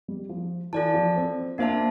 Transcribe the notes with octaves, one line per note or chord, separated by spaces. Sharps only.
G3
F3
E3 F4 A4 D5 A5
F3
C4
A#3 D4 F4 C5 E5 A5